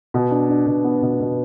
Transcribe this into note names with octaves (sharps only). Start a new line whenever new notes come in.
B2
D4
D4
B2
B3
B2
B2